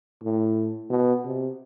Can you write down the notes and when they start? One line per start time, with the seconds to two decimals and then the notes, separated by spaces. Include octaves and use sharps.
0.23 A2
0.90 B2
1.24 C3